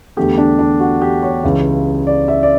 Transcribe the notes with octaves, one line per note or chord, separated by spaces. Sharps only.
E2 D3 A3 G4
D4
D4
F#4
G4
C#5
C#2 C#3 E3
D5
E5
D5